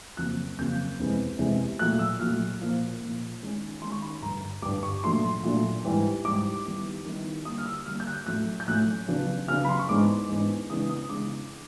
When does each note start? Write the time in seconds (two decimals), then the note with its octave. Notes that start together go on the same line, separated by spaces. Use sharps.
0.17 F2 C#3 F#3 A#3 F#6
0.58 F2 C#3 F#3 A#3 G6
0.99 F2 C3 E3 G#3 B3
1.39 F2 C3 E3 G#3 B3
1.79 A#2 F#3 A3 F#6
1.99 E6
2.20 A#2 F#3 A3 F6
2.61 A#2 F3 A#3
3.02 A#2 F3 A#3
3.42 D#3 G#3 C#4
3.82 D#3 G#3 C#4 C6
3.92 C#6
4.02 B5
4.22 G2 D3 G3 A#5
4.62 G2 D3 G3 D6
4.83 C#6
5.04 A#2 F#3 A3 D4 C6
5.43 A#2 F#3 A3 D4
5.84 G#2 E3 G3
6.25 G#2 E3 G3 D6
6.65 D#3 G3 B3 E4
7.05 D#3 G3 B3 E4
7.45 D3 G3 A#3 D#6
7.58 F6
7.66 E6
7.86 D3 G3 A#3 F6
8.00 G6
8.07 F#6
8.26 A2 F#3 A3 C#4 F#6
8.60 G6
8.68 A2 F#3 A3 C#4 F#6
9.08 C#3 F#3 B3 D4
9.48 C#3 F#3 B3 D4 F6
9.65 B5
9.69 C6
9.79 C#6
9.89 G#2 E3 G#3 B3 D4 D6
10.29 G#2 E3 G#3 B3 D4
10.70 C#3 E3 G#3 B3 D4 D#6
10.90 D#6
11.10 C#3 E3 G#3 B3 D4 D6